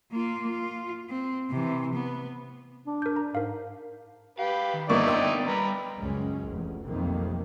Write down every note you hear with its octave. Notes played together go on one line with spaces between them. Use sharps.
A#3 F4
F4
C4
C3 E3
B3
D4
A#4 G6
A#5
G#2 A#4 F5
G4 B4 F5
D#3
G1 D3 A#3 B3 D#4 E4 D5 C#6
G5 C6 E6
G3 B4 A#5
C#2 F#2 G#3 C#4
F1 E2
F1 B1 F2 C3 D#3 A#3